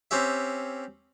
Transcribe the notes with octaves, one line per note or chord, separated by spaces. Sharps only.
C4 C#4 G4 E5